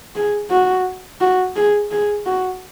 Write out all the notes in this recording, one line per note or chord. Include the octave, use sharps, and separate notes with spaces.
G#4
F#4
F#4
G#4
G#4
F#4